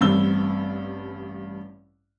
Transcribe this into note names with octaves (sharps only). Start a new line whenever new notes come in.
A1 G2 C4 E6 G7